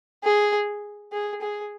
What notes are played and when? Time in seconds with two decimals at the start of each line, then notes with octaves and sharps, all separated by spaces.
0.24 G#4
1.12 G#4
1.41 G#4